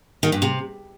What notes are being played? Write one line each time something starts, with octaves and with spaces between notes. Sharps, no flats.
D#3
G2
C3